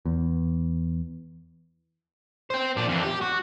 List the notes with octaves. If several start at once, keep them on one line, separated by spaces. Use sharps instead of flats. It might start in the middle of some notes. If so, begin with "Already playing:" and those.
E2
C5 G5
A#2 D4
F2 E3
G4
F#4